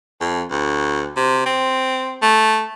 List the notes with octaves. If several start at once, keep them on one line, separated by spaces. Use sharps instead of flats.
F2
D2
C3
C4
A3